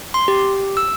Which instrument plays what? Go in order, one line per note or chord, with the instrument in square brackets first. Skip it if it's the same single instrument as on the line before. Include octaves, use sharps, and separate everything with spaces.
[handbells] C6
G4
E6